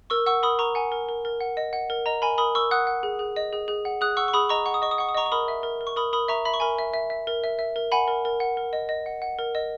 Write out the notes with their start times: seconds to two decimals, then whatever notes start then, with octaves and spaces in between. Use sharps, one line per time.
0.10 A#4 C#6 E6
0.26 F#5 C#6 E6
0.43 A#4 B5 D#6
0.59 A#4 A#5 C#6
0.75 F#5 G#5
0.92 A#4
1.09 A#4
1.25 A#4
1.41 F#5
1.57 D#5
1.73 F#5
1.90 A#4
2.06 D#5 A#5
2.22 A#4 G#5 B5
2.38 A#4 B5 D#6
2.55 A#4 C#6 E6
2.71 F#5 D#6 F#6
2.87 F#5
3.03 G#4
3.19 G#4
3.36 D#5
3.53 G#4
3.68 G#4
3.85 F#5
4.01 G#4 D#6 F#6
4.17 F#5 C#6 E6
4.28 C#6
4.33 G#4 B5 D#6
4.49 D#5 A#5 C#6
4.66 F#5 C#6
4.74 D#6
4.82 D#5 C#6
4.91 D#6
4.98 F#5 C#6
5.09 D#6
5.14 D#5 A#5 C#6
5.26 C#6
5.32 A#4 B5 D#6
5.48 E5
5.63 A#4
5.81 A#4
5.87 C#6
5.96 A#4 B5 D#6
6.13 A#4 B5 D#6
6.28 E5 A#5 C#6
6.45 E5 B5
6.54 C#6
6.60 A#4 G#5 B5
6.78 E5
6.94 E5
7.10 E5
7.27 A#4
7.44 E5
7.59 E5
7.76 A#4
7.92 F#5 G#5 B5
8.08 A#4
8.25 A#4
8.40 F#5
8.57 A#4
8.73 D#5
8.89 D#5
9.06 F#5
9.22 F#5
9.39 A#4
9.55 D#5